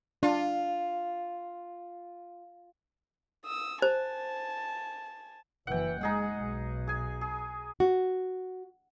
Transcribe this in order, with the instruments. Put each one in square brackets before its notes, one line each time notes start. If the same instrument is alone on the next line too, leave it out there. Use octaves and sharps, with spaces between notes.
[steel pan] D4 [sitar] F4
[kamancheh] D#6 E6
[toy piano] C5 [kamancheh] G#5 A5
[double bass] F#1 E3 [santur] F#5 G5
[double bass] G#3 [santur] D#4 G#4 F#5
[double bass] B1
[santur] G#4 G#5
G#4
[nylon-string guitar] F#4